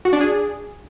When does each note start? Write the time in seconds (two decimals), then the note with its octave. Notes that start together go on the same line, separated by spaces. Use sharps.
0.05 F#4
0.13 D4
0.21 G#4